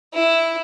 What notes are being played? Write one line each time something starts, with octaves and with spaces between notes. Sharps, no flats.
E4